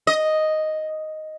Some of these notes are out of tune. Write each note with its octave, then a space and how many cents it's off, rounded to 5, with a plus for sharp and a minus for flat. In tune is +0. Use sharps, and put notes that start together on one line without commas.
D#5 +0